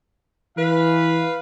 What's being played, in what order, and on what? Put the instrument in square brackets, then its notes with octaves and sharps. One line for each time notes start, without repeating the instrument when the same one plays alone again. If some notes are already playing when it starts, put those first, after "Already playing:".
[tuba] E3 [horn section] B4 F5